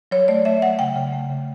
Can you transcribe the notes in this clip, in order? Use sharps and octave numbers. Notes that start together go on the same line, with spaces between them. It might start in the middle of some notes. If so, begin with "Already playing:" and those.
F#3 C#5
A3 D5
A3 E5
F#3 F#5
C#3 G5
C#3
A3
C#3